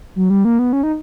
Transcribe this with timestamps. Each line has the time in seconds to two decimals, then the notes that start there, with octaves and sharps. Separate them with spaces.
0.16 F#3
0.30 G3
0.45 A#3
0.59 B3
0.73 C#4
0.83 D#4